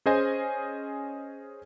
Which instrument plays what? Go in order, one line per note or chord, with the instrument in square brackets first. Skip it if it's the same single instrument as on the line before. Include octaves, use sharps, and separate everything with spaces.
[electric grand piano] C#4 G#4 C5 D#5 G#5